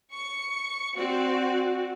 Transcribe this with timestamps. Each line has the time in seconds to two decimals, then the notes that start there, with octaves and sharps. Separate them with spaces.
0.12 C#6 C#7
0.96 C4 F#4 D5